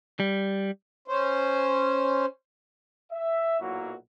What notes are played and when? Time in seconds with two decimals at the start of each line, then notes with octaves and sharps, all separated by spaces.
0.20 G3
1.08 C#4 C5
3.12 E5
3.61 B1 A#2 F#3 A#3 E4 F#4